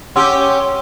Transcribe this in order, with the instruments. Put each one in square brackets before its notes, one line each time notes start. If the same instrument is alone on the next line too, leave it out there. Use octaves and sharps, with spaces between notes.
[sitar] C#4 G4 [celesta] F#5 C6 E6